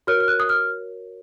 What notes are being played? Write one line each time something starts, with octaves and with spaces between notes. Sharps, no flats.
F#4 A#4 C#5 F6
F6
F#6
D#6
F6